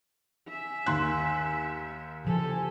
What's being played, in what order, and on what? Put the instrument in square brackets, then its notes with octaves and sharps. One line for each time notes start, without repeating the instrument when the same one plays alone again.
[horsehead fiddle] E5 [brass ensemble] G#5
[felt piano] D#2 C6 F#6
[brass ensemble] F#1 C5 G#5 [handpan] C#3 F3 [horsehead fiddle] G4 A4